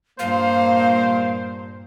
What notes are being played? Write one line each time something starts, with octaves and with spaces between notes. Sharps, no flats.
G2 A#2 A#3 C5 F5